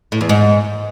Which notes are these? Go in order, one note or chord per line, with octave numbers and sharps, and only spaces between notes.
A2
E2
G#2